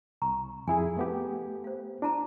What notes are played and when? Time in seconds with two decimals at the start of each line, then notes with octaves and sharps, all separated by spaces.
0.22 C2 A#5 C#6
0.68 F2 E4 G#4 G#5
0.97 A3 B3 G4
1.64 C5 F5
2.02 D4 E4 A5 A#5